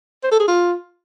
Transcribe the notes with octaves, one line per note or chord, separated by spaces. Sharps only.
C5
A4
G#4
F4